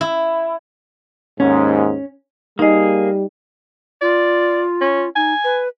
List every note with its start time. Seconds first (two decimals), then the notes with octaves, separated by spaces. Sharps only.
0.01 E4
1.40 D#2 G#2 C#4
2.59 G3 A#3 D#4 G#4 D#5
4.02 F4 D5
4.81 C#4
5.16 D#4 G#5
5.44 B4